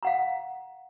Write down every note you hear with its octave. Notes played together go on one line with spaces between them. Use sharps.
F5 F#5 A#5